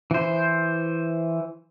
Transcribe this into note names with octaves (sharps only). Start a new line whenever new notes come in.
E3 C5